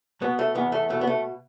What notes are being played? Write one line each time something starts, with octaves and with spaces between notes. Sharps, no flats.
B2 B3
A3
E2 B3
A3
B2 A3
B3
A3